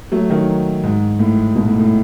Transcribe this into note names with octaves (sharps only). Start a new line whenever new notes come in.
F#3 A3
D#3 F#3
G#2
A2
G#2 B2
A2
A2